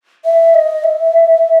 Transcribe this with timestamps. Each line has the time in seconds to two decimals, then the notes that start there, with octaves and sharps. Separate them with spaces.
0.25 E5
0.55 D#5
0.84 E5